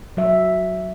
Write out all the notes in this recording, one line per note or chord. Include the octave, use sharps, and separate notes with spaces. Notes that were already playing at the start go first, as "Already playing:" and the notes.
F#3 E5